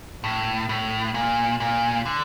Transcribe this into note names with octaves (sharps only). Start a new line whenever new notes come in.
A2
A2
A#2
A#2
D3